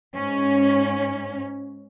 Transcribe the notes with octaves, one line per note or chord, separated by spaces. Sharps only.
G#2 C#4